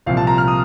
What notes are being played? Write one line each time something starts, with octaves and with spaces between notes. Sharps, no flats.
C2 A#2 F3 C4 F5
A5
A#5
F6
D#6